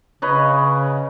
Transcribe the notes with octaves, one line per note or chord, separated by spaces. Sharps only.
C#3 B4 C#5 D#5